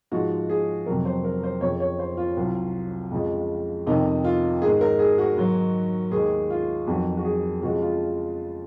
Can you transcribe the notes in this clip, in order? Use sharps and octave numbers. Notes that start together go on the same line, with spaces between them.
G#2 F3 G#3 F#4
G#4
F2 C3 F#3 A#4
C5
A#4
C5
F2 C#3 F3 C#5
C#5
C5
F4
C2 C3 F#3
F2 C#3 F3 G#3
F2 C3 D#3 D#4
F4
G#2 D#3 G#3 G#4
A#4
G#4
F#4
G#2 D#3 F#3
D#2 D#3 G#3 G#4
F4
F2 D#3 F#3 F#4
F#4
G#4
F2 C#3 F3 G#3 F#4
F4